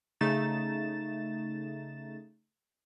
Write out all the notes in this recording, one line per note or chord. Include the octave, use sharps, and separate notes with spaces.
C#3 A3 D#4 A6 E7